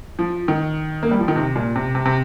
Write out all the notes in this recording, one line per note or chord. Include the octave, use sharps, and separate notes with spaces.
F3
D#3
A#3
G3
F3
D#3
C3
A#2
C3
C3
C3